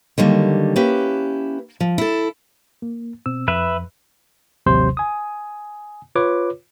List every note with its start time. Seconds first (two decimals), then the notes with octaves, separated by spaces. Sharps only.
0.18 D3 D#3 F#3 G3 A#3
0.76 A#3 C#4 E4 G4 B4
1.80 F3
1.98 E4 A4
2.82 A#3
3.26 B2 C4 E6
3.48 F2 B4 E5
4.66 A1 D#2 C3 F#3 C5 C6
4.97 G#5 D#6
6.16 F4 B4 C#5 D6